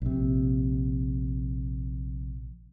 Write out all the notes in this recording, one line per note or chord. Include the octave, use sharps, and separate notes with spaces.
A#1 C3